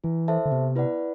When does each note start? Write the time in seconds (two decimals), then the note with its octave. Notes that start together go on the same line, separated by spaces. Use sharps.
0.04 E3 E4
0.28 A4 C5 E5 A5
0.45 D3
0.52 C3 B3
0.75 E4 B4 D5 F#5